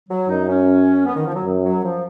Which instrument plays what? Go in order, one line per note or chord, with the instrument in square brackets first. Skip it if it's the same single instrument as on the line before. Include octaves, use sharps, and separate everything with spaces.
[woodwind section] F#3
[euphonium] F#2 [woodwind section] D#4
[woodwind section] C#4
B3
D#3
F3
F#3
[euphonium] F#2
[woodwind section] F#3
F3